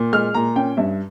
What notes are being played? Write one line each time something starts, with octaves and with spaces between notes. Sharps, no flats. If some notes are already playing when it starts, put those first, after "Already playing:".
Already playing: A#2
G#3 F6
A#2 A#5
C#4 G5
G2 E5